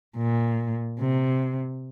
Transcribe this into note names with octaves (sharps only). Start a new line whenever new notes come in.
A#2
C3